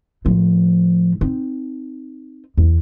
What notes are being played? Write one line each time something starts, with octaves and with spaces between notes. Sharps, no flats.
A2 F3
C4 D#4
E2